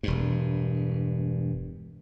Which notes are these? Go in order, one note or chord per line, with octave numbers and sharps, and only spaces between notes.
E1 G2